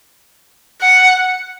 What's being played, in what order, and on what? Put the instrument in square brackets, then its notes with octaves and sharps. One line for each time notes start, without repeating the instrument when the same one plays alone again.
[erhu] F#5